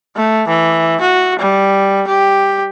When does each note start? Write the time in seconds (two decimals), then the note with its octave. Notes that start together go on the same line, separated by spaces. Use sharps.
0.16 A3
0.48 E3
1.01 F#4
1.39 G3
2.08 G4